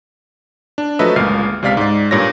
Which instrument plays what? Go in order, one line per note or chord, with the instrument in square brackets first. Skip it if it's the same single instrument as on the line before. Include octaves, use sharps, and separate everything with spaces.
[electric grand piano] D4
F3 F#3 A3 B4 D#5 E5
G1 C#2 A#2 F6 C7
C#2 C3 D5 F5 B6
G#2 D5
G2 A#2 C#5 A#6